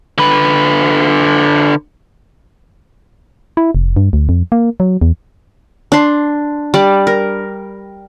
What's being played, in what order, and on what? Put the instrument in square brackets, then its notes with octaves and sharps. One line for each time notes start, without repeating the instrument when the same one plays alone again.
[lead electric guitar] D3 B4
[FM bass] E4
F1
G2
D2
F2
A#3
F#3
E2
[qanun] D4 C6
G3 D5
A#4